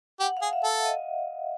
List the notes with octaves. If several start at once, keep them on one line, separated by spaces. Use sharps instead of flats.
G4 F#5
F5
G#4
E5
A4
D#5